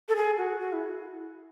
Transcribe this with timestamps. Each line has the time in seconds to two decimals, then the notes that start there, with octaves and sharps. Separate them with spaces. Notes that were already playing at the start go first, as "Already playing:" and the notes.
0.09 A4
0.16 G#4
0.38 F#4
0.60 F#4
0.73 E4